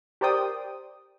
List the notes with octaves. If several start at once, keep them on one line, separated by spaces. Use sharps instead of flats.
G4 A#4 C5 D5 G5 D#6